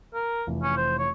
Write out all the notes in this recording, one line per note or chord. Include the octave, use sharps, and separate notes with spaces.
A#4
F1 E3
C#4
C5
C#5